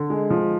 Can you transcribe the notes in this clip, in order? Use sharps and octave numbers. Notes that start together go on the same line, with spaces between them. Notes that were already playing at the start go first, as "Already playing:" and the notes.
Already playing: D3
G#3
F3